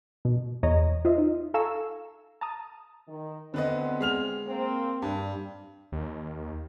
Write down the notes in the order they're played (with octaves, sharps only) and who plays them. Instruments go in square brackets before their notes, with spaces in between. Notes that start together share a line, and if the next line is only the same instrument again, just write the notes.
[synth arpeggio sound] B2
E2 C#5 D#5 A#5
F4 C5 D#5 E5
D#4
A4 F5 G#5 A#5 C#6 E6
A5 A#5 D#6
[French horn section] D#3
[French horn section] D2 B3 C4 [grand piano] D3 B4 D#5
[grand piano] G#3 F6 F7
[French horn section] A#3 C4
[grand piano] G2 [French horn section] G3
[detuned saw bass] D#2